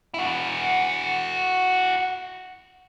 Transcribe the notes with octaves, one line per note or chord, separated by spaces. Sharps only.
E4 F#4